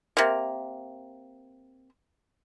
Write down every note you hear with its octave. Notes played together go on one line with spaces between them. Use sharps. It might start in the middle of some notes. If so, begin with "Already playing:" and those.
C3 A#3